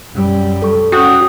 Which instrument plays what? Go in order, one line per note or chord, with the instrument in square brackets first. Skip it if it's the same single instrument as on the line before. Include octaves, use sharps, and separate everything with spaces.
[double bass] F#2 G3
[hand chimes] A4 C#6
[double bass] C#4 [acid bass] F#4 [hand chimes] G5 D#6 G6